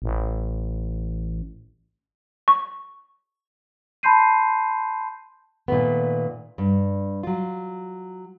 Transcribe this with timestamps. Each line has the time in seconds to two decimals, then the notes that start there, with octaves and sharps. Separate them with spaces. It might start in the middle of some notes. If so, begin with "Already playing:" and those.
0.02 A1
2.48 C#6
4.03 A5 B5 C6 G6 C7 D#7
5.68 A#2 D#3 A3 B3
6.58 G2
7.23 F#3 F4